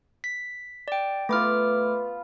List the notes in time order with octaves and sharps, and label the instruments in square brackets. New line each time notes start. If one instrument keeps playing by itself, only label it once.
[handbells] B6
D5 G5
[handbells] A3 D6 F6 [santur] B3 F4